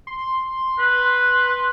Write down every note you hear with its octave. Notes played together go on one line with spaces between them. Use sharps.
C6
B4